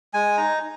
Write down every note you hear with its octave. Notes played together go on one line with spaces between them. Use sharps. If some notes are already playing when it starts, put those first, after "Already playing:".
G#3 G#5
D#4 A#5